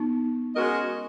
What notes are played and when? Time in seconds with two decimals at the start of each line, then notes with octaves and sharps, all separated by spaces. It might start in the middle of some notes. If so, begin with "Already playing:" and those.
Already playing: B3 D#4
0.54 G#3 C#4 F#4 A#4 D#5